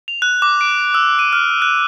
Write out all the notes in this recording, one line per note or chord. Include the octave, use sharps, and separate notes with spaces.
F7
F#6
D6
D7
E6
D#7
F6
F#6